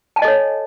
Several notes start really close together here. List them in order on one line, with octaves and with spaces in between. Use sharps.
A5 G#5 D#5 A4 C#5